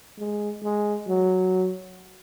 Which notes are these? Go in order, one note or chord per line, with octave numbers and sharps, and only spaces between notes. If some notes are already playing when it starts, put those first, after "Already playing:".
G#3
G#3
F#3